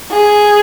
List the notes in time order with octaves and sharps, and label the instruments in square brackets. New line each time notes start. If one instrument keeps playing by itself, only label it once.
[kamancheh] G#4